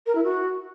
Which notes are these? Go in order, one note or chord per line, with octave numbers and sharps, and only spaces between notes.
A#4
E4
F#4